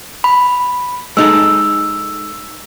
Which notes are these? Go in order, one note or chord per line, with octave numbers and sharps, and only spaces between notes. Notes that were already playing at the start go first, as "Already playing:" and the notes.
B5
G#3 D#4 A4 E6